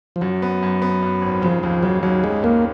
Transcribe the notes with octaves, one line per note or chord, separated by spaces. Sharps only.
F3
F#2 F#3
B3
F#2
B3
F#2
G#1
C#3 F3
D#2 F3
C#3 F#3
D#2 F#3
G#3 C#4
D#2 A#3